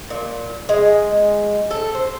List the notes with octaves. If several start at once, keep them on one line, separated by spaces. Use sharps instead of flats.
A#2
G#3
A4
C5